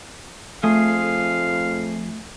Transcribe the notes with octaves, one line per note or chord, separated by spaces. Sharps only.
F2 F3 A3 G#4 F5